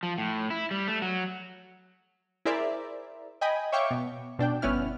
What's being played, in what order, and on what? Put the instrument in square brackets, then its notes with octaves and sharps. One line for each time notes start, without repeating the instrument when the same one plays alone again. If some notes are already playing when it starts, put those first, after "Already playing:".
[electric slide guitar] F3
A2
E4
G3
A3
F#3
[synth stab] E4 G#4 A#4 C5 D5 E5
D#5 G5 G#5 B5 D#6
C#5 E5 F5 G5 C#6 D6
B2
B2 D4 G5
G1 B3 C#4 E4 F6